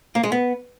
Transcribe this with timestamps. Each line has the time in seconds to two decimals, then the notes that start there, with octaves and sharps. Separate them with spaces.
0.15 A#3
0.23 G#3
0.32 B3